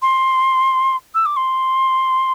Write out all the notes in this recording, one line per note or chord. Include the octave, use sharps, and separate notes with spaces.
C6
E6
D6
C6